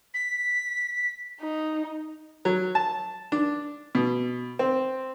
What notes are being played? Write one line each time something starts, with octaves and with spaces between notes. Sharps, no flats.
B6
D#4
F#3
A5
D4
B2
C4